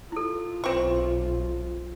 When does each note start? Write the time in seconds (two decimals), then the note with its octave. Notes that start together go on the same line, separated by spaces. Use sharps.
0.12 E4 F4 A4
0.64 B1 C4 C#6